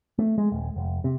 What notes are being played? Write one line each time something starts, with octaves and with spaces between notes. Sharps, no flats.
A3
G#3
D#1
F1
C3